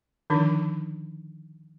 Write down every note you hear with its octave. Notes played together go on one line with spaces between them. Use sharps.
D3 D#3 F3 D4 D#4